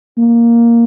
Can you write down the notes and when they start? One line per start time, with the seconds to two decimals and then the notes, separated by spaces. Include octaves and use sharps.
0.18 A#3